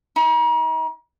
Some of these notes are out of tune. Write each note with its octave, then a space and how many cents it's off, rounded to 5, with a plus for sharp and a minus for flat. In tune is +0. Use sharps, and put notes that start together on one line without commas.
D#4 +40